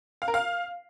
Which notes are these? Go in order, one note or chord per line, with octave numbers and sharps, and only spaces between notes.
F5
A#4
F5